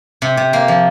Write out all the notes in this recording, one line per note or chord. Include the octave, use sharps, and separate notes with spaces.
C3
C3
A#3
F3